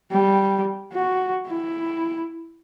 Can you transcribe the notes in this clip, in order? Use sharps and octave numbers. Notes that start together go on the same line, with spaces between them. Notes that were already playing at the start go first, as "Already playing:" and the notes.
G3
F#4
E4